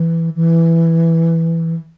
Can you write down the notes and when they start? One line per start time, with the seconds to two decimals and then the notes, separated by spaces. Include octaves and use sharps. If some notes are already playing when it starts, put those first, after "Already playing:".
Already playing: E3
0.35 E3